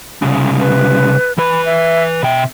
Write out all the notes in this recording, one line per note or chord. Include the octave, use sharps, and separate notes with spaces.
C2 C#3
B4
E3 B4 B5
E5
B2 E5 G5